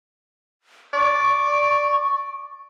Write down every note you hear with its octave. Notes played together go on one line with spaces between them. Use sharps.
D5 C#6